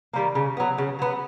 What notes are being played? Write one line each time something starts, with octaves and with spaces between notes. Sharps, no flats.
D#3 G3 A#3
C#3
F#3 B3
C#3
F#3 B3